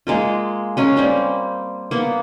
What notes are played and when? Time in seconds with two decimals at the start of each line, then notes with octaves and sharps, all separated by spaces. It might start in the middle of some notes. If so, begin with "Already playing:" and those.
0.07 G#3 A#3 F4
0.77 G#3 C#4 A#4
0.97 G3 A#3 C4
1.91 A#3 B3